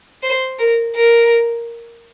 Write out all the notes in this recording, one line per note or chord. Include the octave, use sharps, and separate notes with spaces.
C5
A#4
A#4